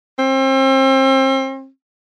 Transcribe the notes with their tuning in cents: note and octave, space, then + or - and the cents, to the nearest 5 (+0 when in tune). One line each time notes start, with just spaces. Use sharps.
C4 +35